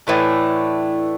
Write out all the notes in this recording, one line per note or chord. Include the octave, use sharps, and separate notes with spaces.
A2 E3 A3 D4